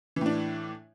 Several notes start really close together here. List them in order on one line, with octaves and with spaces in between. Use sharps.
E3 A2 D4